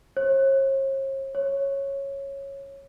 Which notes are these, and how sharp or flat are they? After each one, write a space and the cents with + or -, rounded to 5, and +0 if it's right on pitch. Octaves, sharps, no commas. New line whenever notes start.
C#5 -45
C#5 -10